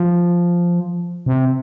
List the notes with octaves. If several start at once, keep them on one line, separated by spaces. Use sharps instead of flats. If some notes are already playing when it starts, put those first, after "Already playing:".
Already playing: F3
C3